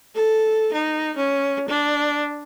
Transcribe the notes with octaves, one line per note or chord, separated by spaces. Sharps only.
A4
D#4
C#4
D4